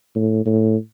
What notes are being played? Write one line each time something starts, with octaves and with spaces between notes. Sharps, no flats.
A2
A2